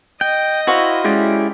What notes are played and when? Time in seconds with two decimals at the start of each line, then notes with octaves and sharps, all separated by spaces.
0.21 D#5 G5
0.67 E4 F#4 C5 F5
1.04 G#3 C#4 E4 G4 D5